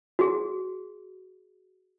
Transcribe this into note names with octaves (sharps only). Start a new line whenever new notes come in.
F#4 G#4